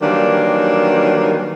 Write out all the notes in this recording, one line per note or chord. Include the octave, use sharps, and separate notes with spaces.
D#3 E3 F#3 G3 A#3 D4